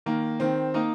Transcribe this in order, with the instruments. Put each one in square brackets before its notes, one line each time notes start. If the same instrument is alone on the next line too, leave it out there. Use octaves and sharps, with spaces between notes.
[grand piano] D#3 A#3
D#3 C4
A#3 D#4